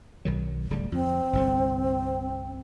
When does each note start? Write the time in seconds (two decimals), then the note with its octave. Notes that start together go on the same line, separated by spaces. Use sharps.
0.25 B1 D#3 F#3
0.70 D1 D3 G3
0.92 F2 C4
1.33 G1 C2 D3